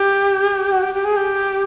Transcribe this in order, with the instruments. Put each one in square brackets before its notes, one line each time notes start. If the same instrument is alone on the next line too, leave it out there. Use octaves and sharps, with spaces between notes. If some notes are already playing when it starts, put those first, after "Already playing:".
Already playing: [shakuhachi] G4
F#4
G4
G4
G#4
G4